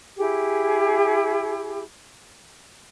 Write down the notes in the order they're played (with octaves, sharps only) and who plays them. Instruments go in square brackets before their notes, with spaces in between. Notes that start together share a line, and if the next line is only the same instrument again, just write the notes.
[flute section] E4 G4 G#4